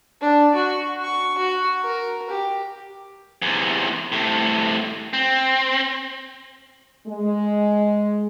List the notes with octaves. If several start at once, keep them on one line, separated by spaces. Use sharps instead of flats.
D4
F#4
C#6
F#4
A#4
G4
E2 C3
A2 C3
C4
G#3